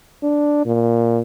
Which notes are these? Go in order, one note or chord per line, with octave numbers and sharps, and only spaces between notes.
D4
A#2